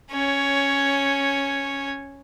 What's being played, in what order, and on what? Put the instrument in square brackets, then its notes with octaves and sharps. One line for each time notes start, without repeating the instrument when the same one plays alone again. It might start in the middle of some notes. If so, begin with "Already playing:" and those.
[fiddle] C#4 C#5